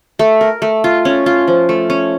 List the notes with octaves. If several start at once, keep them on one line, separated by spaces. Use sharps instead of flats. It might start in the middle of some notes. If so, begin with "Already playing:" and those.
A3
A#4
A3
F4
C#4
F4
F3
A3
C#4